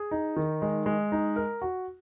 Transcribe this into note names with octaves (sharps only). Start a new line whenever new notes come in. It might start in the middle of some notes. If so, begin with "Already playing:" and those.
Already playing: G#4
D#4
D#3
G#3
G#3
D#4
A#4
F#4